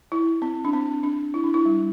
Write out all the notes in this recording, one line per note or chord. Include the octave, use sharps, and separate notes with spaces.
E4
C4
D4
C4
D4
E4
D4
E4
G3